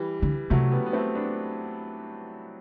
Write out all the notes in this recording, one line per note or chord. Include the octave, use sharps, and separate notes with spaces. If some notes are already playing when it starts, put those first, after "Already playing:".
Already playing: E3 G3
D3
C3 F#3 A3
G3 B3
B3
A3 C4
B3 D4